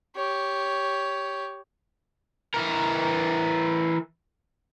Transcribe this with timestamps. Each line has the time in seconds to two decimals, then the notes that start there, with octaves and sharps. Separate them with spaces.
0.16 G4 C#5
2.54 E3 A#4